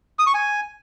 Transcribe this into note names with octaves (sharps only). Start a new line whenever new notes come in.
D#6
C#6
G#5